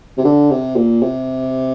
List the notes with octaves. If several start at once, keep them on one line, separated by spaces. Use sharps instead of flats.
C3
D3
C3
A#2
C3